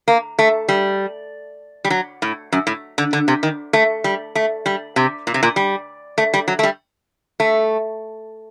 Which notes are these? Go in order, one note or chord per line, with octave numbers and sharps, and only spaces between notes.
A#3
A3
G3
G3
F#3
A2
F#2
A2
D3
D3
C3
D#3
A3
G3
A3
G3
C3
A#2
C3
A#2
G3
A3
G3
F#3
A3
G3
A3